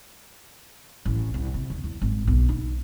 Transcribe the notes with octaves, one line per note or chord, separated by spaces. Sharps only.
A1
C2
C3
D#2
E2
G#1
B1
D#4